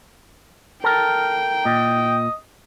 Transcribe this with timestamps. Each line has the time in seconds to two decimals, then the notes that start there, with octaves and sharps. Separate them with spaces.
0.84 A4 A#4 G5
1.65 A#2 D#5